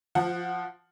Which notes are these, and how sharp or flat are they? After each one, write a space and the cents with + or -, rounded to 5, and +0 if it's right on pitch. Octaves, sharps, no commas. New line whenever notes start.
F3 +0 F4 +40 F#5 +0